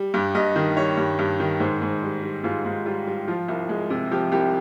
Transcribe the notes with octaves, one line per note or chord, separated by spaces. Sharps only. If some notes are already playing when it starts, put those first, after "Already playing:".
Already playing: G3
G2 G4
G2 D#5
D#3
G3 C#5
G2
G2
D#3
G#2 C5
G#2
G3
G3
G#2 F4
G#2
G3 F4
G3
F3 F4
C2
G#3
C3
F3 G4
C2 G4